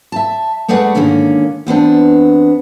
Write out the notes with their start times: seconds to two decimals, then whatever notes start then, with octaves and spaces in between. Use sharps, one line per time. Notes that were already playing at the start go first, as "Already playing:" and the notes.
0.12 E5 A5
0.68 G#3 A3 G#4 B4 D5 F#5
0.95 G#2 D3 D#3 A#3 C#4
1.67 E2 B3 C4 D4